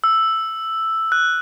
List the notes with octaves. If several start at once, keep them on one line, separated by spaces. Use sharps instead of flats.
E6
F#6